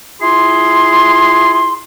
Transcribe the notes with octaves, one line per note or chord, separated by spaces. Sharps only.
E4 F4 G#4 C6